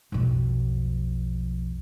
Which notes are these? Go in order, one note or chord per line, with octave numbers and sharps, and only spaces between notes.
B1 F2